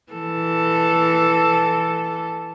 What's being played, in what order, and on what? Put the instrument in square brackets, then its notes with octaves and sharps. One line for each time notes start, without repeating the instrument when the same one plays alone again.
[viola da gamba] E3 A4